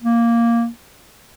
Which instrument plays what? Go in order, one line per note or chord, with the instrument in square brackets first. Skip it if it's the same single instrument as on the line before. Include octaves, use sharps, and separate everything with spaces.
[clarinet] A#3